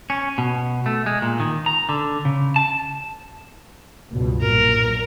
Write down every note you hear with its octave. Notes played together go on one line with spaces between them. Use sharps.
C#4
B2
A3
G#3
A#2
D#3
A#5
D3
C#3
A5
C#2 G2 B2
B1 A#2 A#4